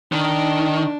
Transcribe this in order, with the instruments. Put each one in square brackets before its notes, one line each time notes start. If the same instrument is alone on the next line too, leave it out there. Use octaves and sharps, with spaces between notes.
[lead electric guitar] D#3 [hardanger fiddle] D4